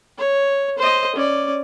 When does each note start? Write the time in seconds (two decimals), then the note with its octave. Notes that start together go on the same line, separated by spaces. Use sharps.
0.18 C#5
0.78 C5 D#5
1.16 C#4 D5